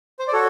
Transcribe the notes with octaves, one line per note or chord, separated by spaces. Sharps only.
C5
D5
F#4 A4 C#5